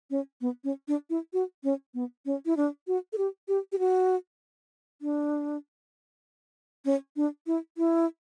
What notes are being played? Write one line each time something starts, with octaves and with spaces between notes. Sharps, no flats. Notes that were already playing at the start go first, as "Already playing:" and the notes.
C#4
B3
C#4
D4
E4
F#4
C#4
B3
C#4
E4
D4
F#4
A4
G4
G4
G4
F#4
D4
C#4
D4
E4
E4